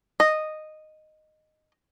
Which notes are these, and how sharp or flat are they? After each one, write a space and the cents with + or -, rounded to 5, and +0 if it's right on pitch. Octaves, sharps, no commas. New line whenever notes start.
D#5 -10